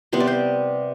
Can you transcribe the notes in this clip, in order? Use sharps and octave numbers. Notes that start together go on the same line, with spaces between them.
C3 G3 B3 C5
D5
C5